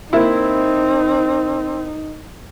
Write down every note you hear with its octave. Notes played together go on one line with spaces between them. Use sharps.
A#3 C4 D#4 E4